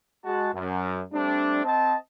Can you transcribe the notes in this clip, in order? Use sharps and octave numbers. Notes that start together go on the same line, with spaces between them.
G#3 F#4 A5
F#2
G3 A3 C4 D4
C4 D#5 A5